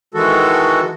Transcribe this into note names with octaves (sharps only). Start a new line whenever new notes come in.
D#3 E3 G#3 F#4 A4